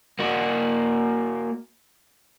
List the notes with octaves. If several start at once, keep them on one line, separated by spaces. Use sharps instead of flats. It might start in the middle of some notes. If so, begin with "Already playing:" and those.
A#3 F#4